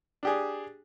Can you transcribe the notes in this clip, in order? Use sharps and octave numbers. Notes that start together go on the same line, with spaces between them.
D4 G4 G#4